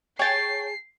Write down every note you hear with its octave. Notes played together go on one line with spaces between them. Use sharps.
G#4 C#5 G5 A5 C7